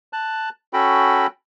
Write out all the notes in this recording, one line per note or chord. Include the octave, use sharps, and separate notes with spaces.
A5 F#6
C#4 F#4 A4 G5 B5